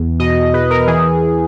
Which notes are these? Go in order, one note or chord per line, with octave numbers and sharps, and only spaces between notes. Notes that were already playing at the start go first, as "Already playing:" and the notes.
Already playing: E2
B2 D#5
E2 B4
A#4
E3 G#4